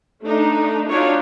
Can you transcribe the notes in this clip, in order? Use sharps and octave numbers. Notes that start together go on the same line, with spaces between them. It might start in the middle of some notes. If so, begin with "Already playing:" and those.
A3 D4 D#4
D4 D#4 F4 F#4 C#5